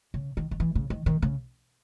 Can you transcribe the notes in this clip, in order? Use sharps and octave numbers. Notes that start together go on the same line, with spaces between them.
C#3
D#3
D#3
E3
C#3
D#3
D#3
C#3